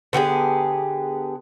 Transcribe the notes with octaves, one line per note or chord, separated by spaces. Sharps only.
D3 B3 G4 G#4